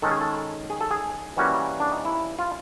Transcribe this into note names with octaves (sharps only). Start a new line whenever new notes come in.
D#3 G#3 C#4 A4
G#4
A4
G#4
A4
G#4
E3 G3 A#3 C#4 F#4
D4
D#4
E4
F4